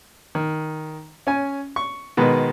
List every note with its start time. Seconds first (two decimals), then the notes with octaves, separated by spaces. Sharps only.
0.35 D#3
1.27 C#4 G#5
1.76 C#6
2.17 B2 D#3 G#3 B4